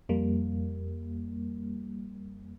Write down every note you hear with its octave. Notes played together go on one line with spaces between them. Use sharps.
F2 G3 A#3